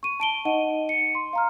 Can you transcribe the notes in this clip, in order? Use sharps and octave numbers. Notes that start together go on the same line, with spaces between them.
C#6 D#7
A5 D7 G7
D#4 D#5 F#5 D#7
C#7
C6
F5 A#5 F6